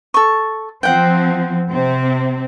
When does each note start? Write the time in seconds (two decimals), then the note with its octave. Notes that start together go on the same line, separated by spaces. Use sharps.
0.14 A4 C#6
0.83 F3 C4 F#5 G5
1.70 C3 C4